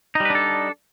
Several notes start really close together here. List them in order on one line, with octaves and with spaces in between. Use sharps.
D#4 G3 B4 D4 A4